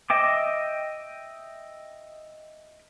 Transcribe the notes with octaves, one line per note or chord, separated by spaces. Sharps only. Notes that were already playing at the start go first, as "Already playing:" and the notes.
D#5 E5 G5 D6